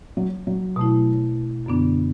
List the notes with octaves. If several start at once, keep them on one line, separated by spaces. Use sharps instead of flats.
F#3
F#3
B2 A3 E4
F#2 D3 B3 D4